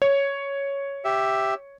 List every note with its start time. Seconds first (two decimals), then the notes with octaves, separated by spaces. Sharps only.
0.02 C#5
1.05 G4 E5